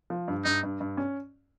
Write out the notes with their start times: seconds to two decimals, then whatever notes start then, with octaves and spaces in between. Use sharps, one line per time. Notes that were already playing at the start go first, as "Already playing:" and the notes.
0.10 F3
0.28 G2
0.44 G2 D#4
0.63 G2
0.80 G2
0.97 C#4